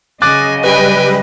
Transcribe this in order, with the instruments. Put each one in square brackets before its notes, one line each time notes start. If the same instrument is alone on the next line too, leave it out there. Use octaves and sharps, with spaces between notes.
[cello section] C#3 F#3 D#5 [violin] G#5 [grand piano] D6 F#6 A6
[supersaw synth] G3 B4 [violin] G5 G#5